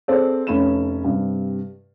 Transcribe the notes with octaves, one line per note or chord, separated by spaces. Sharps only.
C4 G#4 A4 C5 D5
F1 C#4 A4 B5 E7
G2 C3